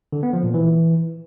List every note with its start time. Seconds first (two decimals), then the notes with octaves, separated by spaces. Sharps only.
0.13 D3
0.23 B3
0.33 F3
0.44 A#2
0.54 E3